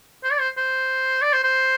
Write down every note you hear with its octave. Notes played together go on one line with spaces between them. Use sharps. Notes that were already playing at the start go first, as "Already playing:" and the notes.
C5
D5
C5
C5
D5
C5
C5